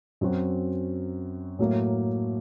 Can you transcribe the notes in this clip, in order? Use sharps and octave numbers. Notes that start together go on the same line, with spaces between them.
F#2 F#3 C4 F#4
A2 F#3 A#3